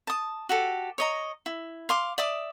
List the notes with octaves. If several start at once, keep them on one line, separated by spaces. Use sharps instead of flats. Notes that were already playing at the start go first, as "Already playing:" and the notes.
A5 D#6
F#4 G4 A4
C#5 D#5 A#5
E4
F5 C6 D6
D5 E5 D6 D#6